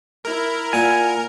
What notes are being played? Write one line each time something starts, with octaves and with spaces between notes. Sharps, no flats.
E4 A#4
A#2 F#5 G#5